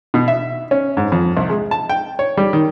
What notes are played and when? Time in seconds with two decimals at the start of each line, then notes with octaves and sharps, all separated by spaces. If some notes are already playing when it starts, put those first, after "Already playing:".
0.14 B2
0.28 E5
0.71 C#4
0.97 G#2
1.12 F2
1.37 C2
1.50 G#3
1.71 A5
1.89 G5
2.19 C#5
2.37 G3
2.53 D#3